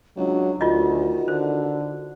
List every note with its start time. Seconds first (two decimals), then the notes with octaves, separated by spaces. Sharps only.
0.17 C#2 F#3 D4
0.61 D2 D#3 F4 F#4 D#5
1.28 D3 C5